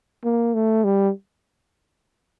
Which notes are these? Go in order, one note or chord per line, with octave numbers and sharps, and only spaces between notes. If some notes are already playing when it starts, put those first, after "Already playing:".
A#3
A3
G3